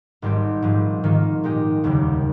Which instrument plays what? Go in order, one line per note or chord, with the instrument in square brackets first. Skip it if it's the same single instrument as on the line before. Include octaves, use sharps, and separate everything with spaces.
[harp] G#1 G#2 G3 C4 G4
A#1 G#2 F3
G#2 D#3 A#3 F4
A#2 G#3 D#4 G4
F1 D#2 C#3 G3